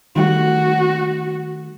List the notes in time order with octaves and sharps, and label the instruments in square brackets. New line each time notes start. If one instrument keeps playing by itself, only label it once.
[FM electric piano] D#3 G3 A3 [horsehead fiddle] F#4